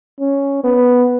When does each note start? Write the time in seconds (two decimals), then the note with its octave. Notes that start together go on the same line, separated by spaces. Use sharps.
0.19 C#4
0.64 B3